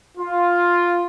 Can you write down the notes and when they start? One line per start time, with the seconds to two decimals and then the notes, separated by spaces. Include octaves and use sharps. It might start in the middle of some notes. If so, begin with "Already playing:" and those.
0.17 F4